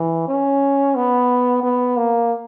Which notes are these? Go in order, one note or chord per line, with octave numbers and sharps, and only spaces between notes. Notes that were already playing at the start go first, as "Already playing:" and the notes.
Already playing: E3
C#4
B3
B3
A#3